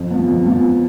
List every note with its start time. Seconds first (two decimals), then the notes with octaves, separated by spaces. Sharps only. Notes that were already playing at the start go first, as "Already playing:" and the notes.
Already playing: F2
0.11 F3 B3
0.28 F2
0.46 F3 B3